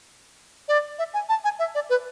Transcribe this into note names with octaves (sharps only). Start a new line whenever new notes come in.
D5
E5
G#5
A5
G#5
E5
D5
B4